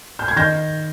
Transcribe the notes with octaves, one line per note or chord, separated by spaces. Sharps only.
G6
G#6
D#3 G6 A#6